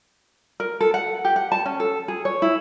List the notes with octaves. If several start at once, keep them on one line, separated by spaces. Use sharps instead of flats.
A#4
A4
F#5
G4
F#5
A5
C#4
A4
G#4
C#5
E4